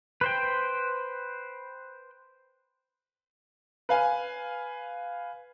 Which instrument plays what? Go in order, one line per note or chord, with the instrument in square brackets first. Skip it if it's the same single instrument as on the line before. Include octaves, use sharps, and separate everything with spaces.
[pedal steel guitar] B4 C5 G5
[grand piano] B4 F5 G#5